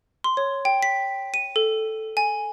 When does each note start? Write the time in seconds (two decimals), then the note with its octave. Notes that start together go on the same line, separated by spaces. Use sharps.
0.24 C6
0.37 C#5
0.65 G5
0.83 B6
1.34 D#7
1.56 A4
2.17 G#5